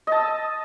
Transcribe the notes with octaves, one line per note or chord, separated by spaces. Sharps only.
D#5 A5 E6